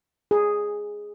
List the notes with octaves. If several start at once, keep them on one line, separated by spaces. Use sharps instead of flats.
G#4